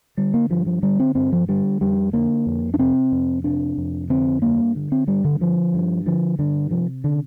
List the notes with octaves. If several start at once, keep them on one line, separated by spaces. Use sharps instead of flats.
D3 G3
A#3
G2 F3
F3
D3 G3
C4
G2 C4
F3
D3 G3
F2 G3
D3 A#3
F2
D4
C3 C4
F2
C3 D4
F2
D3 C4
G2 A#3
D3
C4
G2 G3
D3
D3 F3
G2
D3 F3
G2 D3
C3 F3
D3